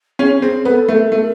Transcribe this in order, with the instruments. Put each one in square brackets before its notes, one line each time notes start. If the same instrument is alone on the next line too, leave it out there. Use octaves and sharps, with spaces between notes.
[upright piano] C#4 [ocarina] G#4
[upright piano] C4 [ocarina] G#4
[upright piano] B3 [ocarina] A#4
[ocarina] A4
[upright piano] A3 [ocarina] A#4
[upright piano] A3 [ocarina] A#4